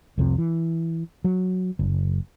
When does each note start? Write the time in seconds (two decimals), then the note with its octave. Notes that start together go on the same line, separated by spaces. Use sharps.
0.18 C2 F2 C3
0.38 E3
1.24 F#3
1.79 F#1